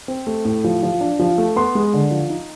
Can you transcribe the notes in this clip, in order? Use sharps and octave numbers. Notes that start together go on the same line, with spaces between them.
C4
A3
A2
F3
F3
D4
F3
A3
B3 C6
G#3
D3
F3
D#4